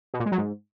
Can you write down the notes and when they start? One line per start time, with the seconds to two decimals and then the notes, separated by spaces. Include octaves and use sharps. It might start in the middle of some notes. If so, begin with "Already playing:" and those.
0.14 B2
0.20 A#2
0.26 G#3
0.32 F#3
0.38 G#2